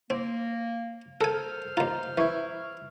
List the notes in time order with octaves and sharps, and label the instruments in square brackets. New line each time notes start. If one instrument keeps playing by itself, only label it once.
[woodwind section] A#3 [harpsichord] C4
[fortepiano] A4 [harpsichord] A#4 G#5 [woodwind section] C5 F6
[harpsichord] D#2 F4 [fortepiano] A#5
[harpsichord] E3 [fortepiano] E4 C#6